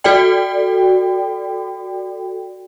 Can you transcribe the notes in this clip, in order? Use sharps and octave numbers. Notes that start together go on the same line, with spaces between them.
F#4 A4 D5 G5